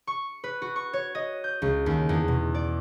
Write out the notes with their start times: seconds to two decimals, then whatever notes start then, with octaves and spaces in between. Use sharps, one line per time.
0.07 C#6
0.44 B4
0.62 F#4
0.76 C#6
0.93 C#5
1.15 D#5
1.44 G6
1.62 C#2
1.86 D#2
2.09 E2
2.28 B2
2.54 D5